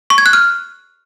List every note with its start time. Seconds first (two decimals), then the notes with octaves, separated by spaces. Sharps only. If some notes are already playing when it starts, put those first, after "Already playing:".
0.10 C#6
0.18 G#6
0.26 F#6
0.33 F6